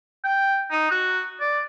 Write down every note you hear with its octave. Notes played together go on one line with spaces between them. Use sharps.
G5
D#4
F#4
D5